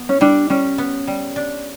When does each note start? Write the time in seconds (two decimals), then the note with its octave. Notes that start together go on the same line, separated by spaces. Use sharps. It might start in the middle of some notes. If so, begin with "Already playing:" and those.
Already playing: B3
0.09 C#4
0.21 G3 D4
0.50 G3 C#4
0.78 B3
1.07 G3
1.36 D4